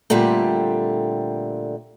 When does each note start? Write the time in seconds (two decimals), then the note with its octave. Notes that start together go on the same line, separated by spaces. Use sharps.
0.10 A#2 D3 G3 A3 C4